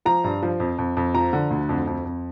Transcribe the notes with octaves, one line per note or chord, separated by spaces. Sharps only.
F3 A#5
G2
F3
F2
F2
F2
F3 A#5
D3
D2
F2
F2
F2